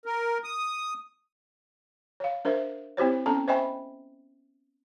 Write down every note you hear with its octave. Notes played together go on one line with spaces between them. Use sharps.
A#4
D#6
C#5 F5
D4 A#4 C5 E5
C4 E4 G4 C5 C#5
B3 C#4 A4 A5 A#5
C5 D#5 E5 G5 G#5 B5